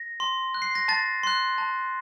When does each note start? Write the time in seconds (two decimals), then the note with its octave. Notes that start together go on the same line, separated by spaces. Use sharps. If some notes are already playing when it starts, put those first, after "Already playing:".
Already playing: A#6
0.20 C6
0.54 F#6
0.62 C7
0.75 A#6
0.88 A5 A6
1.23 C6 F#6
1.58 A5